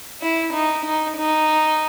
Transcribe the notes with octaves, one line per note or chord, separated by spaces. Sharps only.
E4
D#4
D#4
D#4